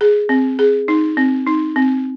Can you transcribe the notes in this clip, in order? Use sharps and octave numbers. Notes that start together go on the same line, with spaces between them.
G#4
C4
G#4
D#4
C4
D#4
C4